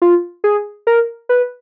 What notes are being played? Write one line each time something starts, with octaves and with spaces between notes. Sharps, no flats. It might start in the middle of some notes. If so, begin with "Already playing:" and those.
F4
G#4
A#4
B4